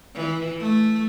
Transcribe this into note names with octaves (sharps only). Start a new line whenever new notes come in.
E3
A3